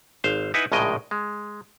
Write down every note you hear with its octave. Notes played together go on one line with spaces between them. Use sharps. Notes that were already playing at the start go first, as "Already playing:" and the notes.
G#1 C5 F5
D#4 E4 B4 F#5 G#5
A#1 A2 C#3 G#3 D#5 G5
G#3